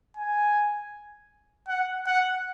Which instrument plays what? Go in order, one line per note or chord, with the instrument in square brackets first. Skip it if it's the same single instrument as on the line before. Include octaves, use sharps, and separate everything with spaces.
[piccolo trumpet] G#5
F#5
F#5